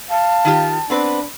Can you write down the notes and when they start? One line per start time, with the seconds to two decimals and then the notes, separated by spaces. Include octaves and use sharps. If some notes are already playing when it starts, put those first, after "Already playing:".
0.10 F5 A5
0.45 D#3 F4 G4
0.90 B3 C4 D4 B4